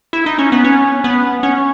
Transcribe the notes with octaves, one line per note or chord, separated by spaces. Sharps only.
E4
D#4
C#4
B3
C#4
B3
C#4